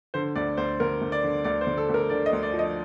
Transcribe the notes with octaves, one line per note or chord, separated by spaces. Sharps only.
D3 C5
D2 D5
D2 C5
D2 A#4
D2
D5
D3
D2 D5
C5
D2
A4
D2
A#4
D3 D5
D#5
D2
D5
F3
D#5